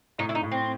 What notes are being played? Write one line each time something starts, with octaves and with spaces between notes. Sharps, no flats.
A2 D#4
E4
D#4
A2
C4